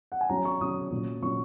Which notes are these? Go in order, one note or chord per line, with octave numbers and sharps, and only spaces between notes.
F#5
G#5
F#3 C#4 A#5
C#6
F#3 C#4 D#6
A#2 F#3 C#4
A#2 F#3 C#4 C#6